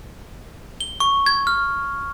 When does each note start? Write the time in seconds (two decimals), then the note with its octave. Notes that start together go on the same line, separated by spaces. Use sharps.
0.81 G7
1.00 C#6
1.26 G#6
1.47 F6